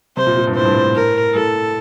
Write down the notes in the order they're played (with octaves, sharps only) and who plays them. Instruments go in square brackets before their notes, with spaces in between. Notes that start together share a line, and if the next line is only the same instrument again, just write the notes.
[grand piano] C3 [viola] C5
[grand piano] A#2
A#2
G2
[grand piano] A2 [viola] C5
[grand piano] G2
A2
[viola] A#4
[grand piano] A2 [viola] A4